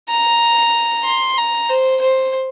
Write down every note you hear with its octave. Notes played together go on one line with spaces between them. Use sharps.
A#5
C6
A#5
C5
C5